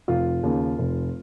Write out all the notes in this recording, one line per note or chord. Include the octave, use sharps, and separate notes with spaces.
F1 F4
D#2 C#3
F1